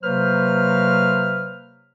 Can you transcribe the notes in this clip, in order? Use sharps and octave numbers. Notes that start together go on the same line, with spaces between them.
C3 F#3 A#3 B4 C5 F6